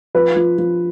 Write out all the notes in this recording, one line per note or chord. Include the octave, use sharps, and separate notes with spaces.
F3 B4
F3
F3